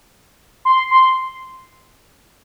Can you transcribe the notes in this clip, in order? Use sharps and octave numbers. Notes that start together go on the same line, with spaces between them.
C6
C6